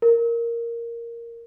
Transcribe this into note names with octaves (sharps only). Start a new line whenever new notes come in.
A#4